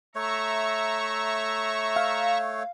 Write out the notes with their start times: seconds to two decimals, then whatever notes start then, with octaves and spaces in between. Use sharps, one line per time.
0.15 A3 C#5 E5 A#5 C#6
1.96 F5